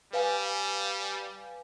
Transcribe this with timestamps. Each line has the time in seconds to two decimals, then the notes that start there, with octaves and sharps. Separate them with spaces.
0.13 G3 B4 F5 G#5